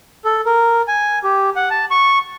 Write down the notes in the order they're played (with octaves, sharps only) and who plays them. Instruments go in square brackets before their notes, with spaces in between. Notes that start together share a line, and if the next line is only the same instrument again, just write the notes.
[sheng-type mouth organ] A4
A#4
G#5
G4
F#5
A5
C#6